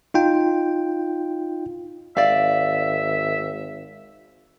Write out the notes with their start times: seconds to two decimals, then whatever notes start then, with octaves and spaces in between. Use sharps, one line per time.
0.14 D#4 F4 G5
2.17 G#1 D5 E5 F5